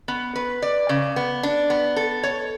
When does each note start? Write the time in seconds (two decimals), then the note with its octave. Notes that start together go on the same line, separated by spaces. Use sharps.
0.08 B3
0.36 B4
0.62 D5
0.89 C#3
1.16 B3
1.43 D4
1.70 B3
1.96 A4
2.23 C#5